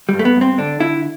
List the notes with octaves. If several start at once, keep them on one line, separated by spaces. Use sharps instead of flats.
G2 G3
A3
B3
G2
C4
D3 D4
D3 E4